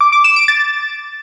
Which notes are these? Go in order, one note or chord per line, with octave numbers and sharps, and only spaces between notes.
D6
D6
E7
D7
A6